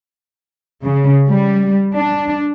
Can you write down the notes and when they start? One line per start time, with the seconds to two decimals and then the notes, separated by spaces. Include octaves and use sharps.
0.85 C#3
1.27 G3
1.95 D4